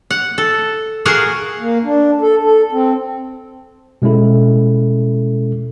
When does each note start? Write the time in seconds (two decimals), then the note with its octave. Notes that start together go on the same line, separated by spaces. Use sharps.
0.11 F#5
0.38 A4
1.05 F#4 G#4 A#4 F5 F#5
1.59 A#3
1.84 D4
2.21 A4
2.44 A4
2.72 C4
4.02 B2 G#3 C#4 E4 A4